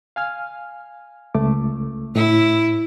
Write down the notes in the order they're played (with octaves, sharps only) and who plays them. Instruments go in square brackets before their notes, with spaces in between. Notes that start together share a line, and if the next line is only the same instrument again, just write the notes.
[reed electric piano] F5 G#5 F6
C#2 A3 D6
[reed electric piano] A2 [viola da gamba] E4